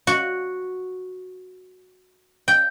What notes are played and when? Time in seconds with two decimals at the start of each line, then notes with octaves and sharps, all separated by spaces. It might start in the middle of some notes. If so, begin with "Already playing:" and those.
0.07 F#4
2.48 G5